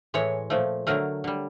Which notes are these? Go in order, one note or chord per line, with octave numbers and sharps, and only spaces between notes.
A2 E3 G#3 C#5
A#2 F3 A3
D3 F#3 A3 A#4
D3 G3